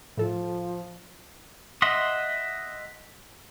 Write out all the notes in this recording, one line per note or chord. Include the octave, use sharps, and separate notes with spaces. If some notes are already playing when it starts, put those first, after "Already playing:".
A2 F3 A4
D#5 E5 F#5 C6 D#6